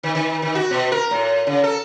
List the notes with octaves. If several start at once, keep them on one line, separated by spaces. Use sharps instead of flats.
D#3
D#3
D#3
F#4
B2
A#4
A2
C#3
A4